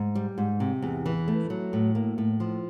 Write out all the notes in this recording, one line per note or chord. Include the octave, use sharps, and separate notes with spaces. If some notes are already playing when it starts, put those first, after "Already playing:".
Already playing: G#2
G3
G#2
C3
E2
E3
A3
F#3
A2
A#3
A2
F3